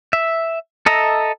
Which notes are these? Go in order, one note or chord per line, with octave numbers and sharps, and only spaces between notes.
E5
A4 D#5 E5 A#5